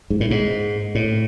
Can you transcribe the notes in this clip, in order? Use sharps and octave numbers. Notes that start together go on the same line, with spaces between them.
G#2
A2
G#2
A2